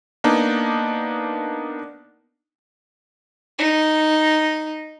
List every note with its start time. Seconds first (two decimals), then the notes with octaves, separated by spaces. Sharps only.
0.24 A#3 B3 D4 D#4
3.59 D#4